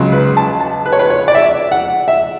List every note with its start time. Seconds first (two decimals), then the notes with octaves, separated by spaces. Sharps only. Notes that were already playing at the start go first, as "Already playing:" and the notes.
Already playing: C#2 C#3 F#3
0.12 B4
0.37 A5
0.60 A5
0.85 B4
0.92 C#5
0.99 B4
1.10 C#5
1.28 D5
1.35 E5
1.72 F#5
2.08 E5